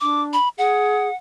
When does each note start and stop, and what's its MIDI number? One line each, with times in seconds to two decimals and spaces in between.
0.01 0.37 62
0.01 0.22 86
0.33 0.49 83
0.58 1.08 68
0.58 1.15 78